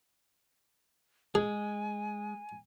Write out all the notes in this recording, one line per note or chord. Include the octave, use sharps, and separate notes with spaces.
G#3 G#4 G#5